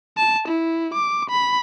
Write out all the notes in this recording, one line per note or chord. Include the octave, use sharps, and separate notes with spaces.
A5
E4
D6
B5